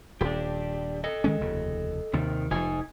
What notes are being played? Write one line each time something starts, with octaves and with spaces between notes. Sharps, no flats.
D#1 D4 G4
A4 D#5
D#3 G#3 C#4
F1 D#2 C#3
D#2 C3 D#3
F1 F3 D#4 G#5